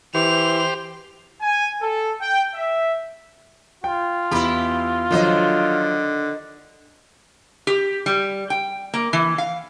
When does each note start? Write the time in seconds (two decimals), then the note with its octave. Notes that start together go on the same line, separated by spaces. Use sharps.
0.15 E3 G4 C5 F7
1.41 G#5
1.81 A4
2.20 G5
2.54 E5
3.84 F4 G5
4.31 E2 E4 G4 B5
5.11 D3 D#3 F3 F#3 C5 D#5
7.67 G4
8.06 G3
8.50 G5
8.94 A#3
9.13 E3
9.38 F5